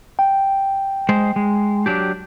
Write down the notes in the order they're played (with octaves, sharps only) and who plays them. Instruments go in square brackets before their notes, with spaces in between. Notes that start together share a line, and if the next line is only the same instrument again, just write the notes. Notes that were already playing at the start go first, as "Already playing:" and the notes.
[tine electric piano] G5
[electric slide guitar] G#3 C5
G#3
F#3 D4 G4